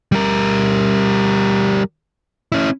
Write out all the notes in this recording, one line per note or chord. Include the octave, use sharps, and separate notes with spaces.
G3 A#4
C#4 E4